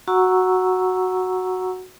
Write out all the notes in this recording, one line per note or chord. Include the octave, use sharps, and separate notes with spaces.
F#4 F#5 A#5 C#6 E6